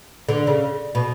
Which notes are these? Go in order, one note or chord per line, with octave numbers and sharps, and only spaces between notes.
D3
C#3
B2